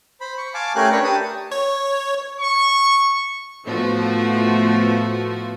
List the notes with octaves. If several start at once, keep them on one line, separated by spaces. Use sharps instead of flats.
C5 B5
C#6
F5 G#5 A5 D6
A3 C#4 G4 A#4 G#5 F#6
D4 G4 A#4 B4 C#5 C#6
G4 A5 D#6
C#5
C#6
A2 F3 A3 B3 F4 F#4